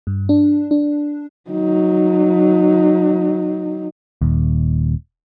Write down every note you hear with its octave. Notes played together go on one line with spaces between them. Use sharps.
G2
D4
D4
F#3 D#4
D#1 D#2